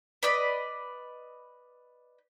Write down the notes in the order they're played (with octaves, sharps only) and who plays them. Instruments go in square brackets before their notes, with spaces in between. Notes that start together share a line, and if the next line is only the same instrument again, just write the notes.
[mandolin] B4 D5 D#5 B5